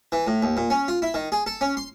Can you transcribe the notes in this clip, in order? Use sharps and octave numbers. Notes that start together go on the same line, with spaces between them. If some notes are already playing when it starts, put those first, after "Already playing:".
E3
A2
D#2
A#2
C#4
F4
E4
D#3
G#4
A4
C#4
C6